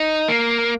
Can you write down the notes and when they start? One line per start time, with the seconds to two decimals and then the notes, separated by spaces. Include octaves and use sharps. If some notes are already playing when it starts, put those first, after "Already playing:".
Already playing: D#4
0.28 A#3